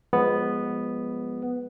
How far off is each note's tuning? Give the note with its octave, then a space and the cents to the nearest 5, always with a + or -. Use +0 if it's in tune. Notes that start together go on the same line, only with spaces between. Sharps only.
F3 +30 G#3 +0 B3 +0